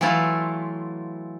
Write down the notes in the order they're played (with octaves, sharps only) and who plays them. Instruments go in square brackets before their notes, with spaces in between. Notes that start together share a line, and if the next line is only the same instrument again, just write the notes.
[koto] E3 F#3 A3 E4 F4